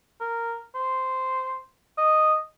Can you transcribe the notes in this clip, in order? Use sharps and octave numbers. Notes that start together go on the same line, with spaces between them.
A#4
C5
D#5